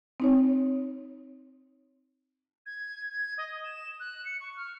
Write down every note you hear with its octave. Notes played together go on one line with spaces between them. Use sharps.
C4 D#4 C#5
G#6
G#6
D#5
E7
F#6
C#7
C#6
F6